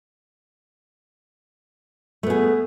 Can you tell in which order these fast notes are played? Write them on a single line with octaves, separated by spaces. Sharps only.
A3 B3 G#4